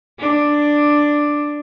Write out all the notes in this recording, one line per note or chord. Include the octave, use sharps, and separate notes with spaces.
D4